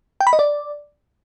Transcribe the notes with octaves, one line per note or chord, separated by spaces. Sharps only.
G5
B5
D#5
D5